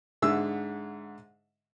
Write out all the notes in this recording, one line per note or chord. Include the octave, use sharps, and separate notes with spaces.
G#2 D3 G#4 E5 E6